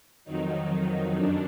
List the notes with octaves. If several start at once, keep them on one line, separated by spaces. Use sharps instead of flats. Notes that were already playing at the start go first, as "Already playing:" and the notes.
F2 D#3 F#3 D#4
F#2 D4